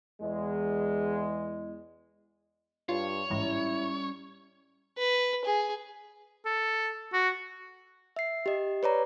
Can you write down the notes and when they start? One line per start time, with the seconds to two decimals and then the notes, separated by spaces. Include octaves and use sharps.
0.21 E2 G#3
2.89 G2 F4 C#5
3.30 A1 G#2 G3 C#4 E4 A#5
4.98 B4
5.45 G#4
6.45 A4
7.13 F#4
8.16 E5 C7
8.46 G4 D#5
8.83 B4 C#5 D5 A#5